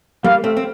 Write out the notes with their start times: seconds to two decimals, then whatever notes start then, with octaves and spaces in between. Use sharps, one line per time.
0.24 G3 A#3 F5
0.44 A3 C4
0.57 C4